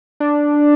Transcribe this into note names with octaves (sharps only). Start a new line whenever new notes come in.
D4